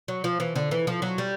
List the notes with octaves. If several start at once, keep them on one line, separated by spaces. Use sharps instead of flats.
F#3
F3
E3
D3
E3
F3
F#3
G3